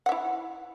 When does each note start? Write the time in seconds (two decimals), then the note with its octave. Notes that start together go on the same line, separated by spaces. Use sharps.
0.06 F#5
0.09 E5
0.12 E4